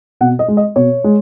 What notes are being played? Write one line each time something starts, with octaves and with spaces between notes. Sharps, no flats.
B2 F#5
D#5
G#3
D#5
B2 C#5
G#3